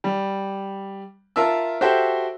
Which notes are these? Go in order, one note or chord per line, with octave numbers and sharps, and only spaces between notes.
G3
F4 A#4 E5 A5 E6
F#4 G4 A4 C5 E5 G5